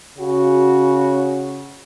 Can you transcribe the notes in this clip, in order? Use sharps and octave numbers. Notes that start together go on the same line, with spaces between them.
C#3 F#4